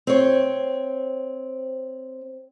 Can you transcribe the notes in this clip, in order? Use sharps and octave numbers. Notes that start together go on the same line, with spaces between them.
C4 C#5